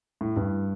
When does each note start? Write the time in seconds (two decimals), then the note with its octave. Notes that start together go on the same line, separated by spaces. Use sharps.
0.21 A2
0.36 G2